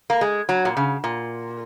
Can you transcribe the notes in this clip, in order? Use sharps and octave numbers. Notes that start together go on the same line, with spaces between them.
A#3
G#3
F#3
A#2
C#3
A#2